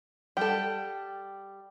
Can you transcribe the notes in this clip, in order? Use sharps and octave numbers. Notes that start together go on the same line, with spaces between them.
G3 A4 G5